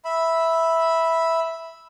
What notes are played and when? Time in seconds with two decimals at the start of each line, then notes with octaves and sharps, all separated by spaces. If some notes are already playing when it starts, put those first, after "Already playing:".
0.05 E5 B5